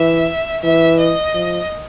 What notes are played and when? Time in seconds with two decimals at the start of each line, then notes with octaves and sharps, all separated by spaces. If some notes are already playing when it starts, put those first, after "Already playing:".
Already playing: E3 E5
0.62 E3 E5
0.99 D#5
1.34 F3